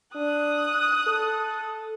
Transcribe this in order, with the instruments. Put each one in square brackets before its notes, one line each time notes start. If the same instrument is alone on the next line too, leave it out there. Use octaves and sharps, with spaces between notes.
[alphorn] D4 [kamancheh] D#6 F#6
[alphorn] A4